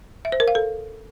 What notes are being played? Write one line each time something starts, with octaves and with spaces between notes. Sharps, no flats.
E5
C5
A#4
F5
A4